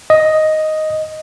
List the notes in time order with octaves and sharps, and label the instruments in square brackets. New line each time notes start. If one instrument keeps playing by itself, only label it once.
[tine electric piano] D#5